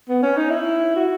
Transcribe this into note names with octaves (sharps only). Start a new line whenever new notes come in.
B3
C#4
D#4
E4
F#4